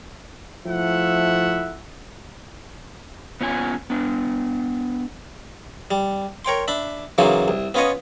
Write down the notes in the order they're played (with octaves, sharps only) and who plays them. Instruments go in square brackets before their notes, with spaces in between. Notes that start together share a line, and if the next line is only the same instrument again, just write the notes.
[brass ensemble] F3 A3 E4 E5 F#5
[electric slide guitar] B3 C#4 F4 C#5 G#5
B3 D4
[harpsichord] G3
A#4 C#5 G5 C6
D4 E5 B5
C#3 E3 F#3 A#3 D#4 F4
C2
B3 C#4 F4 B4 C#5 D#5